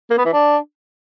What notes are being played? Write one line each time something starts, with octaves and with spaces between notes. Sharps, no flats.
A#3
B3
E3
D4